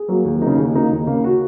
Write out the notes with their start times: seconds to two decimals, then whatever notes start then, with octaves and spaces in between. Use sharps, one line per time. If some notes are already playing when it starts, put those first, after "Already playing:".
Already playing: G#4
0.08 F#3 A#3
0.25 D#2
0.42 C#3 A#3 D#4
0.58 D#2
0.74 C#3 A#3 D#4
0.91 D#2
1.07 C#3 A#3
1.24 F#4